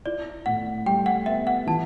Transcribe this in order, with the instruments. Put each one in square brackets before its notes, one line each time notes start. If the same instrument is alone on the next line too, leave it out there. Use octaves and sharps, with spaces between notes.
[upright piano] E4 [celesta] D5
[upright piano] A2 [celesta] F#5
[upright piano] G3 [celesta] G5
[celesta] F#5
[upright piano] B3 [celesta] E5
[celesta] F#5
[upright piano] E3 [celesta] A5